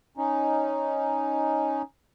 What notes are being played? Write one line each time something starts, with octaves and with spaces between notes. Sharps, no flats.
C#4 D#4